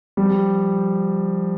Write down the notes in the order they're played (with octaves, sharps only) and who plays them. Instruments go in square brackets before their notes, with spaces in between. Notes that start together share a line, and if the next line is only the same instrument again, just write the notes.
[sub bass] F3 [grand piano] G3